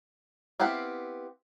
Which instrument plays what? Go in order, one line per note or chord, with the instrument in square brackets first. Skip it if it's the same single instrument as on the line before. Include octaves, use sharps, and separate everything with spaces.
[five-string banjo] B3 C4 E4 G4 F5